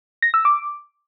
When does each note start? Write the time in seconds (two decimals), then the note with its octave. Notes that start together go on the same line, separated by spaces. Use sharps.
0.22 A#6
0.34 E6
0.45 D6